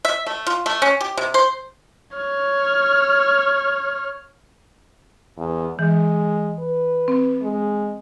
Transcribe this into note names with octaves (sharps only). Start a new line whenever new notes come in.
E5
A3
F4
A3
C#4
G4
C3
C5
C#5 F6
E2
E3 G#3
B4
C4
G#3